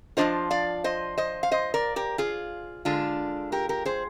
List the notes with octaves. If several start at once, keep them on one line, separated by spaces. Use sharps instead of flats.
F3 G#3 D4 F4 C5 D#5
D5 F5
C5 D#5
C5 D#5
F5
C5 D#5
A#4 D5
G4 A#4
F4 G#4
D3 G#3 D4 F4
G4 A#4
G4 A#4
G#4 C5